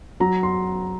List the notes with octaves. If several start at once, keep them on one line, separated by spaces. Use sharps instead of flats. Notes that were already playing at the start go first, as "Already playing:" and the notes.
F#3 A#5
C6